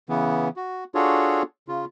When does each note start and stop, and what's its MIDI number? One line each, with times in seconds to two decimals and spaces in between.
0.09 0.48 49
0.09 0.48 52
0.09 0.48 59
0.56 0.84 66
0.95 1.42 62
0.95 1.42 65
0.95 1.42 66
0.95 1.42 68
0.95 1.42 69
0.95 1.42 73
1.68 1.85 49
1.68 1.85 65